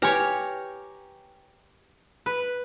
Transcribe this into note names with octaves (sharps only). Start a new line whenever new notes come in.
G4 B4 C#5 G#5 A#5
B4